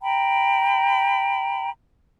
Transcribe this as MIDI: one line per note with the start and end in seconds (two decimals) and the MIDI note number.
0.02 1.70 79
0.02 1.70 82
0.02 1.70 83